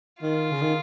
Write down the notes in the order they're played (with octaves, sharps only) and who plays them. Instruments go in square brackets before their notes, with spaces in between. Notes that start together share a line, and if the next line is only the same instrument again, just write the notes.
[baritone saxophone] D#3 [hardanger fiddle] F4
[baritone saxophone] C#3
D#3